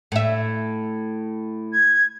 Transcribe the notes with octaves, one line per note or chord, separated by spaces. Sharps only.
A2 E5
G#6